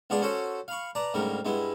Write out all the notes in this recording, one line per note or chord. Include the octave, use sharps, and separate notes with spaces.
C#2 B3 F4 G#4 D5 A5
C#4 F#4 A4 C5 C#5
F5 B5 C#6
B4 D5 A5 A#5
D2 G#2 C#3 G3 A#4
G2 G#3 B3 E4